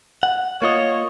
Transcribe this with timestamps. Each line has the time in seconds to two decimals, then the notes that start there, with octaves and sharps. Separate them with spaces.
0.23 F#5
0.62 A#3 F4 C#5 D#5